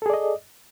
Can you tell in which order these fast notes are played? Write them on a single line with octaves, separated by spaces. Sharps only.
A4 G#4 D5 D#5